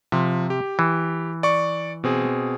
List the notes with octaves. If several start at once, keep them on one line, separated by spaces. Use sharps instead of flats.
C3 F3
G4
E3
D5 C#6
B2 C4 G#4